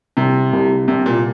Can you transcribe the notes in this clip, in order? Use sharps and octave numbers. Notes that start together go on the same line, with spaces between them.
C2 C3
C2
C2 C3
A#2